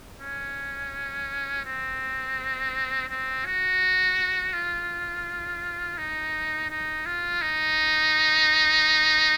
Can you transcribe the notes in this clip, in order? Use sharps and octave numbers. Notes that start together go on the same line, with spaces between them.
C#4
C4
C4
F#4
F4
D#4
D#4
F4
D#4